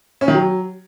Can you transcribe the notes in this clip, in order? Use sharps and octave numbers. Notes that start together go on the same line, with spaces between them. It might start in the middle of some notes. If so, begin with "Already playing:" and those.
C#4
D#3
F#3